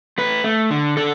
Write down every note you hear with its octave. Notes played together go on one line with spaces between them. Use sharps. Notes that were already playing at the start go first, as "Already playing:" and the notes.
A3 B4
A3
D3
D3 A4